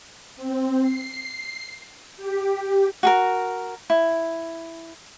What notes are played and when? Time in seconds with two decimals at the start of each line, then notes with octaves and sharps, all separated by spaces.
0.37 C4
0.82 C7
2.17 G4
3.03 F#4 G#4 A#4
3.90 E4